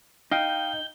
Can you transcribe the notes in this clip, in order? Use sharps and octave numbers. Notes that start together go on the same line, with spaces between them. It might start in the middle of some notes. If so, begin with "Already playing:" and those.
D#4 D#5 F5 G5 G6